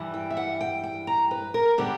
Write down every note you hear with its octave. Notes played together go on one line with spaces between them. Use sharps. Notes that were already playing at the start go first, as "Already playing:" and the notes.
Already playing: G2 E3 G3
G5
E5
F#5
G5
G5
A#5
B4
A#4
D3 G3 B3 D4 G4